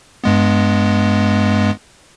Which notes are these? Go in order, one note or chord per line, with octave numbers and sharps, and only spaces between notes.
G2 G#3 B3